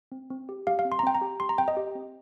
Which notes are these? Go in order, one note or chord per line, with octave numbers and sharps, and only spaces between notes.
C4
C4
G4
G4 F5
F5
C4
C6
A#5
C4 G5
A#5
G4
G4 C6
A#5
C4 G5
D#5
G4
C4